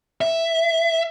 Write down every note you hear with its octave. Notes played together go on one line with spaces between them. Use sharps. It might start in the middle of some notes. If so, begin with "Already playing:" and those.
E5